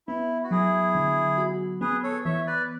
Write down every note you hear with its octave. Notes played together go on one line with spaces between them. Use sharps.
B3 E4
F#4
F#3 E4 G#4
D3
F#4
B3 G#4 B4
A4 C#5
E3 C#5 E5
B4 D5